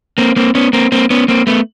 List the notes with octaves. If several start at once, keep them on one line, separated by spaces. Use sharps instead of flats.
A#3 C4
A#3 C4
B3 C#4
A#3 C4
A#3 C4
B3 C#4
A#3 C4
A3 B3